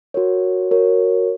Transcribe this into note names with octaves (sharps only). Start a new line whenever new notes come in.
F#4 A#4 C#5
F#4 A#4 C#5